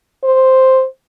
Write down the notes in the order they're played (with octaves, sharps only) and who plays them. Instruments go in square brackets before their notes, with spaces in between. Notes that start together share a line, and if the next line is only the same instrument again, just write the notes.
[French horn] C5